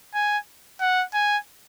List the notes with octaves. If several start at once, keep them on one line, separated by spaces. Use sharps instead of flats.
G#5
F#5
G#5